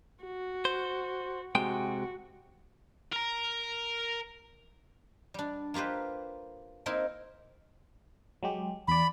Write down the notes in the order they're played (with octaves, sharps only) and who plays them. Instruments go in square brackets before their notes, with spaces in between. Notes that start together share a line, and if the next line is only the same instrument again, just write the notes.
[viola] F#4
[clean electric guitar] C5
[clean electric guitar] C3 G#3 G5 [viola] F#4
[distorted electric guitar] A#4 A#5
[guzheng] G3 D4
A#3 F4 G4 B4 C5
A#3 C4 D#4 E4 A#4
[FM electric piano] F#3 G#3 G4
[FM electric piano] E2 D5 [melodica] B5